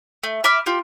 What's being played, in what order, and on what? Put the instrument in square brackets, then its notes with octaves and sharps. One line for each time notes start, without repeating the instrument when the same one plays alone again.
[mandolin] A3
E5 B5 D6 F6
F4 G4